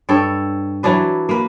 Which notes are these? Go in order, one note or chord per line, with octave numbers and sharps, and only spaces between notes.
G2 A4 C#5 G5
E3 F#3 D4 B4
A#3 B4